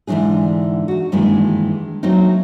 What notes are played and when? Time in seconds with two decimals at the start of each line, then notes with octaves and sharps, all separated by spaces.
0.07 G#2 D3 E3 F#3 D4 G#4
0.88 D#4 F#4
1.12 G2 D#3 E3 G#3 A#3
2.03 F#3 A3 A#3 C4 D#4